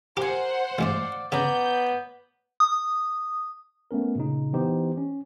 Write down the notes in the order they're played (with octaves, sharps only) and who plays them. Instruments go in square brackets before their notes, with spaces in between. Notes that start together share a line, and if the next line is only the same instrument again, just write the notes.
[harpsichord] G4 [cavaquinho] A#4 G#5 [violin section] C5 F#5
[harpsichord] A1 G#2 [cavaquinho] D5 F5
[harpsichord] C#3 [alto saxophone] B3 [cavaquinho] C#5 D5 A#5 [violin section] G6
[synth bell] D#6
[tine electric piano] A3 B3 C#4 A#4
A#2 C#3 D#4
E3 B3 D#4 G4 C5
C#4